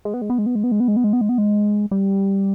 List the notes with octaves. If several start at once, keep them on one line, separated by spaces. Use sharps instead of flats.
G#3
B3
G#3
B3
G#3
B3
G#3
B3
G#3
B3
G#3
B3
G#3
B3
G#3
B3
G#3
G3